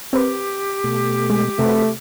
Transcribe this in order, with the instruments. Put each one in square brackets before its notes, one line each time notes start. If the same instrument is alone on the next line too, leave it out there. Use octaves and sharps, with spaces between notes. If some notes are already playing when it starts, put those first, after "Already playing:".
[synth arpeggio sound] C4 A#4 B4 [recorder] G4
[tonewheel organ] B2 A3
[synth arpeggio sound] G#3
[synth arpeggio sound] C3 [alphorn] A3 [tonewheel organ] C4 F#4 B4